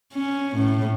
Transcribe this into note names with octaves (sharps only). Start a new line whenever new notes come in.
C#4
A2